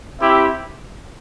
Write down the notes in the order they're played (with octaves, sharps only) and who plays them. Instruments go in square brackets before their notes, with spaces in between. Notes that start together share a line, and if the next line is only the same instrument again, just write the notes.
[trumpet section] C4 E4 G4 E5